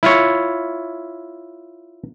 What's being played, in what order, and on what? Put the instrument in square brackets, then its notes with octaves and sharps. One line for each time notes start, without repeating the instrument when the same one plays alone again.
[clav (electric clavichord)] E4 F4 C#5